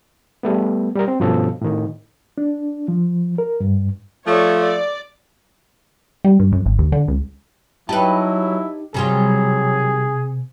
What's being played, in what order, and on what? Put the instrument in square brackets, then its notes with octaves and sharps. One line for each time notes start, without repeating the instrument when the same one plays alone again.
[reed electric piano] G3 A3 B3
G3 G4 A#4
C4
G2 B2 F3 C#4 A4
A2 D#3
D4
F3
A#4
G2
[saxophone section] F3 A3 [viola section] C#5 D5
[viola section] D5
[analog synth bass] G3
G2
F#2
G#1
D#2
D3
C#2
[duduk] F#3 [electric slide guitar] D#4 D#5 A5 [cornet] E4 [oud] G4 B4
[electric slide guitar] C3 [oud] D#3 G3 F4 [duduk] F#3 [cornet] G#4